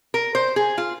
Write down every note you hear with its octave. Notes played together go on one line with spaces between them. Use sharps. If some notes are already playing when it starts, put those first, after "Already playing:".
A#4
C5
G#4
F4